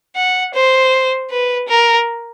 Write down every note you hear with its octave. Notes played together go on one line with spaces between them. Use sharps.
F#5
C5
B4
A#4